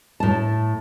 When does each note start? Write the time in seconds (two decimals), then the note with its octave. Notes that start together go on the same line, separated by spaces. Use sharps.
0.20 A2 A5